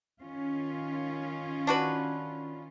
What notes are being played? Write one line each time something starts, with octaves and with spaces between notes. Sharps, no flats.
D#3 C#4 F4
D4 F#4 B4